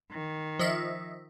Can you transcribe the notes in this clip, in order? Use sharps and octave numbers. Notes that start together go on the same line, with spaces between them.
D#3
F3 D#5 E5